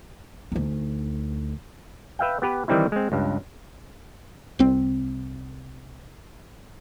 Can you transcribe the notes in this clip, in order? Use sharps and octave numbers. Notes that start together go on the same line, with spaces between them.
D2 D#4
B4 E5 F5 G5
B3 G4 B4
D#3 E3 G3 C4 D#4 E4
G#3 C4
C#2 G2
C2 C4